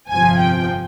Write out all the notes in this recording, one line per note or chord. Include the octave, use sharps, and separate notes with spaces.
G1 F2 C3 F3 G#5
G5